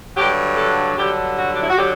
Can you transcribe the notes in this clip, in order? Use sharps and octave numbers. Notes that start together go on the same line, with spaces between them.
G2 D3 F#3 G4
A4
G2 D3 F#3 G4
F#4
D4
E4
F#4
D3 F#3 G4